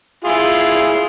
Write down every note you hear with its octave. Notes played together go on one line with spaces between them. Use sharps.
E4 F4 G#4